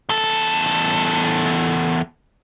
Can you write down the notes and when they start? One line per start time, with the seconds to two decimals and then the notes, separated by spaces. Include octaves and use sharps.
0.09 E2 A4